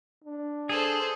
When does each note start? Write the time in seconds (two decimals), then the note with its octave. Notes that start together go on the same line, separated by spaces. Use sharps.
0.24 D4
0.69 G#4 A4 C5